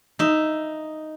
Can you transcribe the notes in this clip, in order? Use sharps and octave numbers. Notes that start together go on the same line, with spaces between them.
D#4 E5